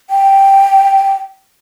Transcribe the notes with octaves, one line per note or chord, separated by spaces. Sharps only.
G5